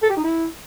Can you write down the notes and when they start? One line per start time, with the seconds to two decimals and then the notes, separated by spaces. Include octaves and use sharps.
0.02 A4
0.09 G4
0.16 D#4
0.24 E4